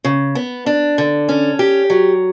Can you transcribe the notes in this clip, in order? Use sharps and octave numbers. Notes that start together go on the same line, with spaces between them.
C#3
B3
D4
D3
C#4
G4
F#3